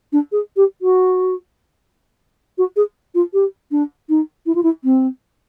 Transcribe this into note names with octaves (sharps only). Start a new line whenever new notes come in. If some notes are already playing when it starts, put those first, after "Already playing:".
D4
G#4
G4
F#4
F#4
G#4
F4
G4
D4
D#4
E4
F4
E4
C4